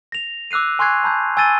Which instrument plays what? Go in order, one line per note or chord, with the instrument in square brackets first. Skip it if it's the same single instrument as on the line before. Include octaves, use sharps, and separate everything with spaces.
[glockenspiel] A#6 F7
D6 E6 F#6 C7 D#7
G#5 C6 C#6 F#6 G#6 C7
A5 B5 G6
G#5 E6 G#6 A6 D#7 G7